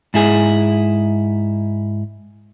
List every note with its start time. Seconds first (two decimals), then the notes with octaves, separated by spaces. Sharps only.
0.14 G#2 E4 G#4